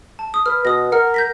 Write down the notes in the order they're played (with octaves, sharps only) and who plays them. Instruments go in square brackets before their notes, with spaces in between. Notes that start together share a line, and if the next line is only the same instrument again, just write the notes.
[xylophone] A5
D#6
[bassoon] B4 [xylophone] F6
[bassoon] B2 [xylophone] D#6 A#6
[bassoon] A#4 [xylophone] F#5 F6
[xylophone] G6 A#6 B6